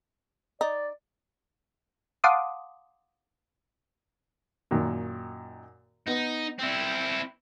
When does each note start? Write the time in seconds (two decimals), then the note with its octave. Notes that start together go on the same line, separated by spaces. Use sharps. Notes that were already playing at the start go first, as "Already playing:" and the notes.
0.61 D#4 D5
2.24 F5 F#5 A5 C6 D6 D#6
4.71 F#2 A#2 D#3
6.08 B3 D#4
6.59 C4 E4